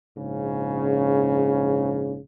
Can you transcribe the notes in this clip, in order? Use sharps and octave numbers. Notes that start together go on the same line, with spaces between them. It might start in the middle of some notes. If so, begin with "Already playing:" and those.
A#1 G#2 C#3